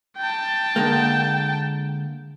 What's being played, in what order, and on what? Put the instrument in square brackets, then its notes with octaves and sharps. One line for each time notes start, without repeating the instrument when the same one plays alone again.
[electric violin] G5 A5
[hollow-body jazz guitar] D3 G#3 A#3